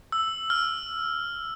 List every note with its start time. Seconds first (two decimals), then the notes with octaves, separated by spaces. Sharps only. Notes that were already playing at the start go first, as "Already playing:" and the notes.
0.12 E6
0.50 F6